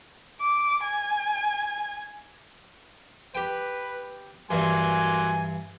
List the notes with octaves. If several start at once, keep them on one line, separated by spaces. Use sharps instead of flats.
D6
G#5
G4 B4 G5
G2 E3 F#3 G3 A#3 G#5 C6